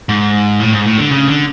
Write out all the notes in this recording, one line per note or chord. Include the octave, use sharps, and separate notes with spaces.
G#2
A2
G#2
A2
D3
C#3
D3